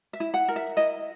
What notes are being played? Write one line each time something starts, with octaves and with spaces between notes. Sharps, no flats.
E5
E4
F#5
A#4
E5
E4 D#5